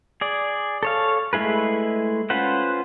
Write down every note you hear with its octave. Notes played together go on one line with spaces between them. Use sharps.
G#4 D5
A4 C#5 F5
G#3 A3 E4 G#4 B4
C#4 F4 B4 C5 F#5